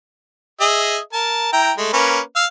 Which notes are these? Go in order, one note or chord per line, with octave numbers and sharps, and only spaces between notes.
G#4 D#5 E5
A#4 A5
E4 G5 A#5
G#3 A3
A#3 C#4 B4
F5 E6